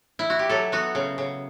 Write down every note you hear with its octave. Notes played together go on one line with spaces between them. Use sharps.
E4
F#4
G4
F#3 A4
B3 F#4
C#3
C#3